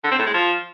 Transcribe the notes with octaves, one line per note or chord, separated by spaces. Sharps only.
D3
C4
A2
G#3
F3